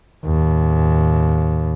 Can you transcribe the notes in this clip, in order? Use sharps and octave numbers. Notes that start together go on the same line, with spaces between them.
D#2 A2